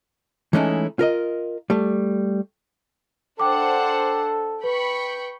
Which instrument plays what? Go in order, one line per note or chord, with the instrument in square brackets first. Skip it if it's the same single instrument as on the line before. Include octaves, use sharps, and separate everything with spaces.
[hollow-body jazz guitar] E3 G#3 A3 C#4 D#4 E4
F4 A#4 D#5
G3 A3
[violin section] D4 C5 F#5 [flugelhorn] A4 [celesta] G5 D6
[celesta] B4 [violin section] G5 B5 C#6